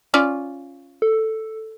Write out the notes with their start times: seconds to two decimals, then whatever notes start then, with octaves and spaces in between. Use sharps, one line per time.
0.14 C#4 F4 D5
1.02 A4